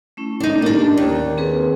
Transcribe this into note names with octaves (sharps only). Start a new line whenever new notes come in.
A3 C#4 E4
D4 D#4
A#3 C#4 D4 G4 D5
D#2
C4 G#4 B4